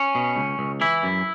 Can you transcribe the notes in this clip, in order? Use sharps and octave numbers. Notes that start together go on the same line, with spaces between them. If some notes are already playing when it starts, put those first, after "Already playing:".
Already playing: C#4
B2
C#2
C#2
E3 E4
F#2